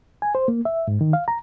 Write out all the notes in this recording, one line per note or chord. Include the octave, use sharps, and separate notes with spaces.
G#5
C5
A#3
E5
G#2
D#3
F5
A#5